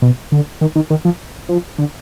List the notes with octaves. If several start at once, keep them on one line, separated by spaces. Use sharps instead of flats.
B2
D3
D#3
D#3
D#3
F3
F3
D3